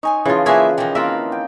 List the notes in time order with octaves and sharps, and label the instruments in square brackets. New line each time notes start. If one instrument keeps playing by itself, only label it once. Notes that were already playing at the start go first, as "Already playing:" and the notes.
[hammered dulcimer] D#4 [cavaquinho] C#5 G#5 C6
[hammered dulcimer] C#3 F3 [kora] E3 F4
[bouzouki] A#3 E4 E5 [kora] G#4 B4 [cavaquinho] C#5 D5 G#5
[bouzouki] D#3 E3 [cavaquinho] G4
[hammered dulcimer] A#3 C4 [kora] F4 A#4 E5 [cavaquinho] B4 D6
[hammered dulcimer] G5